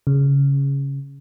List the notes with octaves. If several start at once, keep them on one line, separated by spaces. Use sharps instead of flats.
C#3